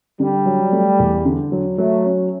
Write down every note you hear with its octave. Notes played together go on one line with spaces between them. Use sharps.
D3 G3
F#3
A3
E2
D3
F#3
F#3 A3
C#4